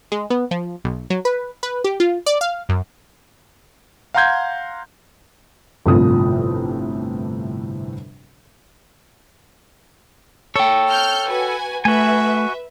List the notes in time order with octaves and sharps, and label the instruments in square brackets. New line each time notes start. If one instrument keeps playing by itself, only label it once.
[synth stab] G#3
B3
F3
B1
F#3
B4
B4
G4
F4
D5
F5
F#2
[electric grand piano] F5 F#5 A#5 C6 G6 G#6
[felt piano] G1 A2 C3 F3 D#6
[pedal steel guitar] A4 [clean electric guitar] C#5 G5
[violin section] F6 G6
F#4 B4 G#5
[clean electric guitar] A3 [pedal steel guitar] F#4 G#5 [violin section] B4 E5